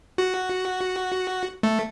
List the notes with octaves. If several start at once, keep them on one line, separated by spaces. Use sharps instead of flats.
F#4
A3